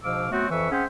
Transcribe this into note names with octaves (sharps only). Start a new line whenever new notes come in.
G#2 B2 F3 F5 D6 E6
F#3 A3 B3 C4 F#4
F2 E3 B4 E5 C#6
C4 C#4 G#4 C5 E5 F#5